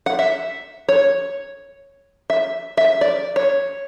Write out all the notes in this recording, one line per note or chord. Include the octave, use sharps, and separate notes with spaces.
F#5
E5
C#5
E5
E5
D5
C#5